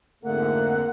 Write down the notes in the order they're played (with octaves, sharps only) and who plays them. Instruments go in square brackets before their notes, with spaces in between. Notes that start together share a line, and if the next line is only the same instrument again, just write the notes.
[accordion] F2 G#2 D3 [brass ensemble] A3 [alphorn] A#3 [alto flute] F#5